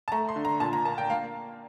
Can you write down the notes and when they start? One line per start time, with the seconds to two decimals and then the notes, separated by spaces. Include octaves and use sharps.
0.08 A5
0.12 A3 A#5
0.29 C6
0.36 D3
0.45 A#5
0.60 A#2 A5
0.73 A#5
0.85 A#3 A5
0.98 G5
1.10 A#3 F5